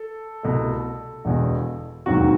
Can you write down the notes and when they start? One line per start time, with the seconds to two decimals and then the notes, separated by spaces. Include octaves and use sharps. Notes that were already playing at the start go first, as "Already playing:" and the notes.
Already playing: A4
0.43 C2 B2 A3
1.25 E1 E2 B2
2.06 E1 D#2 D#3 F#3 C4 F#4